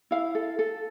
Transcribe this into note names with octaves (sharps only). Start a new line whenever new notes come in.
E4 F5
A4
A4